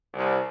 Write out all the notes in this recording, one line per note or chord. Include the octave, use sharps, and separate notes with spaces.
C2